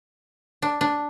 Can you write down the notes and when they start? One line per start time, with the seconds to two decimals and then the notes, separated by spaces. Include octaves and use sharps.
0.62 D4
0.81 D4